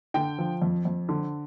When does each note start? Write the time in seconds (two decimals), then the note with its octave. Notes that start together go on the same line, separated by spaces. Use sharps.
0.14 D3 G5
0.38 F3
0.62 F2
0.85 F2
1.09 D3